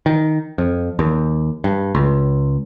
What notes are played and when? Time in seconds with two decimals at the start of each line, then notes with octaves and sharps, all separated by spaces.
0.06 D#3
0.58 F2
0.99 D#2
1.64 G2
1.95 C#2